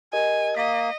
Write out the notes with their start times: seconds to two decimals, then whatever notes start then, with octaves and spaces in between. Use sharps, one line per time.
0.13 G4 A#4 D#5 G#5
0.57 A#3 D#5 B6